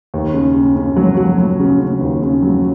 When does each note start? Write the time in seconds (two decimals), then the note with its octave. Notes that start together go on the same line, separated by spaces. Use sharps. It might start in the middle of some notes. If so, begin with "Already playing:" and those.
0.14 D#2
0.34 C#3
0.56 C#3
0.76 C#3
0.96 F#3
1.17 F#3
1.38 F#3
1.60 C#3
1.81 C#3
2.01 D#2
2.22 C#3
2.42 F#3